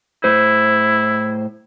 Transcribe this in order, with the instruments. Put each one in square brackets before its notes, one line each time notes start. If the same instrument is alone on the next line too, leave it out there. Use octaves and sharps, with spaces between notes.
[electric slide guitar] A2 C5 [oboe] E4